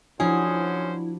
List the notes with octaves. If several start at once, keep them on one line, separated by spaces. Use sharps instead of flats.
F#2 F3 C#4 D4 E4 F#4 G#4 C5